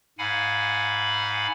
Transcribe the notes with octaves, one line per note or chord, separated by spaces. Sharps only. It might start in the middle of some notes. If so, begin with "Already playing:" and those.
G#2 F5 F#5 G#5 B5